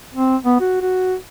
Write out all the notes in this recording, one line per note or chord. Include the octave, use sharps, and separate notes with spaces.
C4
B3
F#4
F#4